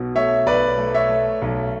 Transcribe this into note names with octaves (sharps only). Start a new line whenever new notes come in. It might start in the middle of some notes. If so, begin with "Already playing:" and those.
Already playing: B1 B2
A3 C#5 E5
B1 B4 D5
A3
C#5 E5
A3
B1